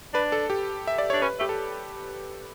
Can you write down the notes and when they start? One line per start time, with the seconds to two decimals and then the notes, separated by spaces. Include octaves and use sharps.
0.14 D4 B4
0.32 A4
0.50 G4
0.87 E5
0.98 D5
1.10 D4 C#5
1.22 C#4 B4
1.39 A3 G4
1.49 A4